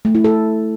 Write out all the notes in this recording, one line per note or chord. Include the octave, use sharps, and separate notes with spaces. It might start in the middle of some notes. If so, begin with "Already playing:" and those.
A3
E4
A4